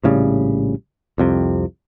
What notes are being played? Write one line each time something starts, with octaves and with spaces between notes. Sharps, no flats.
A#1 A2 C#3 G3
C2 F2 C3